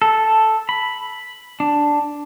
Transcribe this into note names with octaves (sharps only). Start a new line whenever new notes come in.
A4
B5
D4